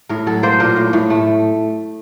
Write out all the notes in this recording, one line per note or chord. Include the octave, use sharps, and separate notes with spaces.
A2 A#4
F#3 A4
A#3 C5
A#2 A#4
A2
A2
A3